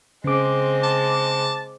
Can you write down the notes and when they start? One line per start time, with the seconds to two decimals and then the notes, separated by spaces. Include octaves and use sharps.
0.24 C#3 G#3 C4 D6
0.83 A5